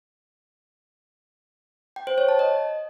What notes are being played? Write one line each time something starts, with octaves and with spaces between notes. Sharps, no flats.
G5
C5
C#5
A5
D#5